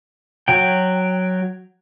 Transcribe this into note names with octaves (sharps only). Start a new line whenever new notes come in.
F#3 G5